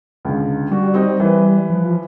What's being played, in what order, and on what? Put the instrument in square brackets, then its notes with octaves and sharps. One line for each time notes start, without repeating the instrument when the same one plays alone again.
[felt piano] C#2 D3
[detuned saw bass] G3 [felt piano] F#4
[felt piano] C4 D#4
E3 B4
[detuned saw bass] F3